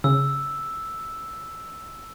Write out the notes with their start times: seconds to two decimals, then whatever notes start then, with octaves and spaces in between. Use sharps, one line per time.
0.04 C#3 E6